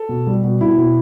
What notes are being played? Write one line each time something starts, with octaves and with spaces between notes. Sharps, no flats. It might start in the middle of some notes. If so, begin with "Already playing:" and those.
Already playing: A4
B2
G3
B2
B2 E4
B2